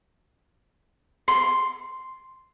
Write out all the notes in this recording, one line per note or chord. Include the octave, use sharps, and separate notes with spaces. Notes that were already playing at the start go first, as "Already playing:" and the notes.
C6